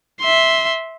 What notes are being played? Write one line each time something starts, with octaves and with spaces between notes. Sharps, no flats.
E5 C6